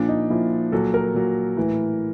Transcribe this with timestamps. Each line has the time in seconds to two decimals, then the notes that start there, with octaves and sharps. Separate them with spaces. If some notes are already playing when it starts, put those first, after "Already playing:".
Already playing: A#2 F3 D4
0.09 D#4
0.30 A#2 F3 E4
0.72 A#2 F#3 A4
0.94 A#4
1.14 A#2 F#3
1.57 A2 E3